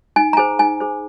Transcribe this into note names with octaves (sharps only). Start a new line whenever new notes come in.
D#4 G#5
A#5
G#4 C5 G#5
D#4 G#5
G#4 C5